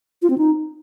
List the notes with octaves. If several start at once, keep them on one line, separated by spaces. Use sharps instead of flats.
F4
C4
D#4